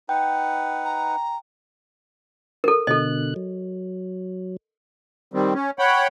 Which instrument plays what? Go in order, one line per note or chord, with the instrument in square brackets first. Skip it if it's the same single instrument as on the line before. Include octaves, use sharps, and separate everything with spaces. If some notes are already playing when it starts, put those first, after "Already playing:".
[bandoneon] D#4 B4 F#5 [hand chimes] G5
[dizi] A#5
[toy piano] A4 A#4
[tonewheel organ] B2 D3 F#6 [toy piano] A4 D#5
[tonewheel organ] F#3
[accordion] D#3 G3 C4
C#4
C#5 F#5 G5 B5